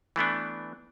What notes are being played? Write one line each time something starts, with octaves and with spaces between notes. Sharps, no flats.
E3 A3 B3 D4